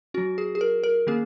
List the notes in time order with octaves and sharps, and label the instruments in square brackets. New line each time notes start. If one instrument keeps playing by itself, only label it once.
[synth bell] F#3 C#4 F#4
G#4
G#4
A#4
A#4
D#3 A#3 C#4 G#4